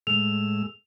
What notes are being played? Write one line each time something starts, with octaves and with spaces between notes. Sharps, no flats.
A2 G#3 E6 F7